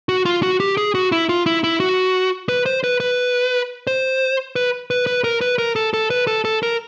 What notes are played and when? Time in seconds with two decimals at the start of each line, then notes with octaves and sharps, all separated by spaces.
0.09 F#4
0.25 F4
0.43 F#4
0.60 G4
0.77 G#4
0.95 F#4
1.12 E4
1.29 F4
1.46 E4
1.64 E4
1.80 F#4
2.49 B4
2.66 C5
2.84 B4
3.00 B4
3.87 C5
4.56 B4
4.91 B4
5.07 B4
5.24 A#4
5.41 B4
5.58 A#4
5.76 A4
5.94 A4
6.10 B4
6.27 A4
6.45 A4
6.63 A#4